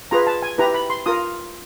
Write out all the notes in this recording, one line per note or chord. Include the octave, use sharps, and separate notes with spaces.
F4 G#4 B4 A#5
A5
G#5
E4 G4 B4 A#5
B5
C6
F4 A#4 D#6